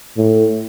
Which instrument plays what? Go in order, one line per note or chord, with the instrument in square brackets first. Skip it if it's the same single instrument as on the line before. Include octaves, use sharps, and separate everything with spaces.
[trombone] A2